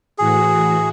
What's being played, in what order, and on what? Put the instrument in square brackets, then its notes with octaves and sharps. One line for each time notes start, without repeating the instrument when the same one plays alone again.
[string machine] A2 E3 F#4 [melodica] G#4